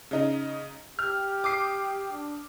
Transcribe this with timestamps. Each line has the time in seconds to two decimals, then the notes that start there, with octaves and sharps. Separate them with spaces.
0.11 C#3 D#4
0.99 G4 F6
1.44 D6 D#6 C7
2.12 D4